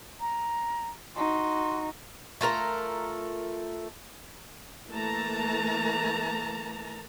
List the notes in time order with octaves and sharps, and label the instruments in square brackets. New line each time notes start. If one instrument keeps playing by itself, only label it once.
[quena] A#5
[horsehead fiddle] D#4 F#4 [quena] C6
[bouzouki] A3 F4 A#4 A#5
[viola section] E3 A3 A#3 A5 A#5